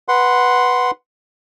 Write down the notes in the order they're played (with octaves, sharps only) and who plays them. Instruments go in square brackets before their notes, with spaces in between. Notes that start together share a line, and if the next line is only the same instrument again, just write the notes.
[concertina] B4 F#5 C6